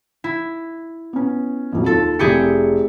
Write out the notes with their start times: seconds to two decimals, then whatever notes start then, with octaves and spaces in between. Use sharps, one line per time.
0.24 E4
1.13 B3 C#4
1.73 A#1 F2 F#3
1.86 D#2 F4 A4
2.19 F1 E4 G4 G#4 C#7